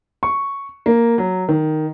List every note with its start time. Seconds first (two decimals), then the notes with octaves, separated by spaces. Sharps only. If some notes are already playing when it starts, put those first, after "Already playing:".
0.23 C#6
0.86 A#3
1.18 F#3
1.49 D#3